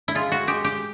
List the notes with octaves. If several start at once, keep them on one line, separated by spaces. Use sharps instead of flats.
E4
G#3 F4
F#4
G#3 G4
G4